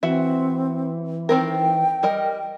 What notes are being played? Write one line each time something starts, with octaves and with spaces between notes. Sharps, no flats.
E3 C4 F#4 E5
D#3 C4 A#4 G5
G3 A#4 D#5